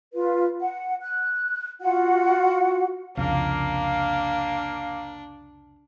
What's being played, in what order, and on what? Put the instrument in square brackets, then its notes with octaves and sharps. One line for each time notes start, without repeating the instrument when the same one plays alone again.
[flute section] F4 B4
F#5
F#6
F4 F#4 F#5
[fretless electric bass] C2 F2 C#3 [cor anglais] A#3 [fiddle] D4 [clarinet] F5